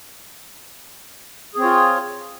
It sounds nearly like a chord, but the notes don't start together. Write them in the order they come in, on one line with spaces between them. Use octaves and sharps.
G#4 C4 C#5 F4